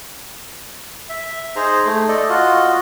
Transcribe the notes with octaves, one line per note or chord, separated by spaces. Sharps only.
E5
D#4 G#4 C5 A#5
A3
A4 D5 D#5
F4 F#4 D#5